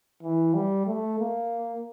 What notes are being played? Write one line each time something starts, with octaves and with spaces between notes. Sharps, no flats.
E3
G3
A3
A#3